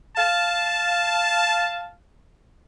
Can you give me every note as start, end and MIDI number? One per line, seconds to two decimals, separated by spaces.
0.17 1.89 77
0.17 1.89 81